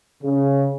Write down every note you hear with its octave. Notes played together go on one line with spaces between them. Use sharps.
C#3